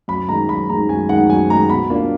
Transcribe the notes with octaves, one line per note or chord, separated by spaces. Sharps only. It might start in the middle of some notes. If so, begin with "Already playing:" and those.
F#2 B5
D#3 G#3 D#4 A#5
F#2 B5
D#3 G#3 D#4 A#5
F#2 G#5
D#3 G#3 D#4 F#5
F#2 G#5
D#3 G#3 D#4 A#5
B2 B5
A#3 D4 F4